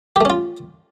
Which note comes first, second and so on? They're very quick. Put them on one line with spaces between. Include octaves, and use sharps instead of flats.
G4 A3 C#4 F4